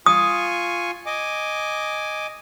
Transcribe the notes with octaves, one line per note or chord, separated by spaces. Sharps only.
F4 G#5 C#6 D#6
D#5 G#5 D6